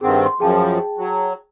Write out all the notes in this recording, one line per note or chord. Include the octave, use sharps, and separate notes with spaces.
G2 D#3 C4 G#4 F#5
C6
F#2 F3 G#4 G5 A5
F#3